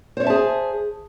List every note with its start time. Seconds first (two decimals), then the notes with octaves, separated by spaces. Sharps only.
0.17 C5
0.20 C#5
0.23 E5
0.27 A5
0.30 G#4